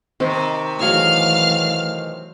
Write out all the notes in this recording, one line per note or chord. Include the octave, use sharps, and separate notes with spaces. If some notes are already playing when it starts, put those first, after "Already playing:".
C3 D#3 C4
E3 F#3 A3 G#4 F5 C#6 F6